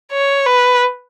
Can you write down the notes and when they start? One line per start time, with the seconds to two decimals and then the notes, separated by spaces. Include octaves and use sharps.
0.12 C#5
0.46 B4